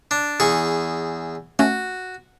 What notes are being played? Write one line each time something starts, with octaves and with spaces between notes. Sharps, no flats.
D4
E2 G#4 C#6
A3 C#4 F#4